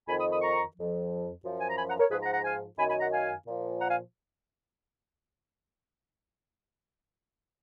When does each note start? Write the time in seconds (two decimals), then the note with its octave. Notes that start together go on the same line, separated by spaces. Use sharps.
0.08 F2 D#3 G#5 B5
0.19 B5 D#6
0.31 B5 D#6
0.42 A#5 C#6
0.76 F2 F3
1.44 F#2 F3
1.60 G#5
1.69 A#5
1.77 G#5 B5
1.88 F#5 A#5
1.99 A#4 C#5
2.11 G#2 F3 G#4 B4
2.22 F#5 A#5
2.33 F#5 A#5
2.44 F5 G#5
2.79 F#2 D#3 G#5 B5
2.89 G#5 B5
3.01 F#5 A#5
3.12 F5 G#5
3.46 A#2 F3
3.80 F#5 A#5
3.90 F5 G#5